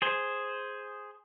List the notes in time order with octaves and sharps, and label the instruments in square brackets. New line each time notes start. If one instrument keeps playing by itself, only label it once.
[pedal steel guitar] G#4 C5